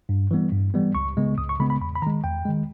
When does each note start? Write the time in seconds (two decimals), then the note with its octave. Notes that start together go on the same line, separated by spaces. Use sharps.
0.09 G2
0.31 E3 G3 B3
0.52 G2
0.74 E3 G3 B3
0.95 C#2 C#6
1.17 C#3 G#3 B3
1.37 C#2 D#6
1.49 C#6
1.59 C#3 G#3 B3 B5
1.70 B5
1.81 E2 B5
1.95 B5
2.02 D#3 A#5
2.07 G#3
2.24 E2 G5
2.45 D#3 G#3